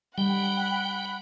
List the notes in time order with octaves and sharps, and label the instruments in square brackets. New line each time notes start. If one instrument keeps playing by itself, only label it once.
[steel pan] G3 [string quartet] F#5 B5 [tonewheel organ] G5